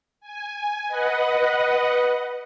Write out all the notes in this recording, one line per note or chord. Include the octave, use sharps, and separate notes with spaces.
G#5
B4 D#5 F#5